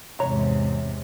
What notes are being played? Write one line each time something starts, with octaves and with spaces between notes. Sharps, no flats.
E2 G#2 C3 C#5 A#5